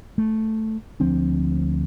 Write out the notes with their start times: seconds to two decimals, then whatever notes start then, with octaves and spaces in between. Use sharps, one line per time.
0.18 A3
1.00 D2 F3 C4 D4